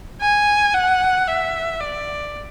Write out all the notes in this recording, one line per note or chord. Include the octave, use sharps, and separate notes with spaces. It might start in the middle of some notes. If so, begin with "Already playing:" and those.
G#5
F#5
E5
D5